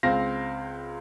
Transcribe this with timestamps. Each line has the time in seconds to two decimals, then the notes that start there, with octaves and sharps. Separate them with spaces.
0.03 C#2 C4 F5 A#6